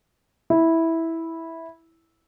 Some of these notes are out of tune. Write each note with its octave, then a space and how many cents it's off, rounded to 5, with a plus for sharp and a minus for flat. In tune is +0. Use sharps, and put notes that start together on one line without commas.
E4 -10